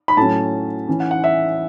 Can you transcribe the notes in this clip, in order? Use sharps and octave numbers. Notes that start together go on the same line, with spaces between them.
B5
A2 F#3 C#4 A5
E3 C#4
F#5
F#5
E5